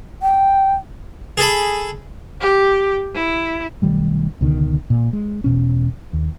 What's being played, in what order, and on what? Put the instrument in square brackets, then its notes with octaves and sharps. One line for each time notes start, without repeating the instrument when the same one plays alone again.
[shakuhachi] G5
[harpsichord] G#4 A4 B5
[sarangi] G4
E4
[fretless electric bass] B1 D#3 G3 A3
C#2 B2 D3 D#3
A#2
G#3
E1 B2 C#4
D#2